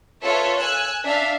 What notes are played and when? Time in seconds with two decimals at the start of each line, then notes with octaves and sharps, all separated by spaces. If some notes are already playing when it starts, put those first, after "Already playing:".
0.23 F4 A4 B4 C#5 E5
0.58 G#5 E6 F#6
1.04 D4 E5 F5